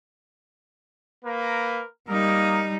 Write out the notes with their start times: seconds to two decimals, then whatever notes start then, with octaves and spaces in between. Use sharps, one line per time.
1.23 A#3 A#4 B4
2.08 G3 A#3 D#4 A#4 D#6